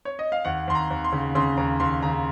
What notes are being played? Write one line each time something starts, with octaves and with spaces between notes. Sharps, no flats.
C#5
D#5
F5
D#2 F#5
D#2 C6
A#5
D#2
C6
C#3
C#3 C6
D#2 A#5
D#2 C6
C#3 A#5